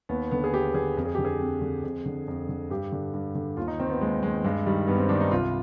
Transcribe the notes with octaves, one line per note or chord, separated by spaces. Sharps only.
D#2 B3
D3 B3
G#4
D#2 G4
D3 G#4
F2
G#4
D3 G4
G#4
F2
D3
F2
D3
F2
D3
G2 G4
D3
G2
D3
D#2 F4
D#4
D#3 C4
B3
D#2 G#3
D#3 G#3
G2 G#3
D#3 G3
G2 B3
C4
D#3 D4
D#4
C2 F4